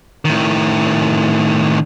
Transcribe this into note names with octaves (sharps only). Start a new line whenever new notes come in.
A2 D#3